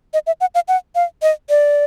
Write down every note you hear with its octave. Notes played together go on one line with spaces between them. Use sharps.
D#5
E5
F#5
F5
F#5
F5
D#5
D5